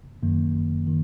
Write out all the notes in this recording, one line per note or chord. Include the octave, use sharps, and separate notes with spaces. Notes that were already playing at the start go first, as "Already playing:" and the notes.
Already playing: G1
F#2 D#3 F#3 A#3
G1
D#3